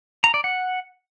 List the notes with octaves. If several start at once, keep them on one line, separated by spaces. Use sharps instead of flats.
A#5
D5
F#5